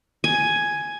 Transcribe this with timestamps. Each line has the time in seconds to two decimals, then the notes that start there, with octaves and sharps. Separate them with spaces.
0.24 G#5